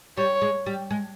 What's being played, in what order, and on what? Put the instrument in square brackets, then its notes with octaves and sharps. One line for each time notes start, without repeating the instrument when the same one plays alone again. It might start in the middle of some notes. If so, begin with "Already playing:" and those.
[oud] G3 [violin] C#5
[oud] G#3
G3
G#3